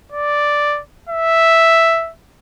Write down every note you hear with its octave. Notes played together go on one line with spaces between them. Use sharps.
D5
E5